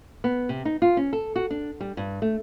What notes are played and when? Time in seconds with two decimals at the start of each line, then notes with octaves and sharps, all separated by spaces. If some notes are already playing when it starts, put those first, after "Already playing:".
0.24 B3
0.49 C3
0.65 D#4
0.82 F4
0.97 C#4
1.13 A4
1.36 F#4
1.51 D4
1.81 G3
1.97 G2
2.22 A3